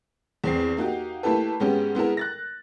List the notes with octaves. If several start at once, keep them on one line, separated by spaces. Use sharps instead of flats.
E2 C4 C7
A#3 D#4 F#4 G4
A3 A#3 E4 G4 A4 B4
G#2 G#3 B3 C#4 G4
G#3 B3 E4 A#4
F#6 A6 A#6